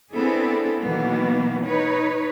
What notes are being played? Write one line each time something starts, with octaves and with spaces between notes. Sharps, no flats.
B3 C4 D4 E4 G#4 A4
B2 D#3 E3 F#3 A#3 B3
D#4 B4 C#5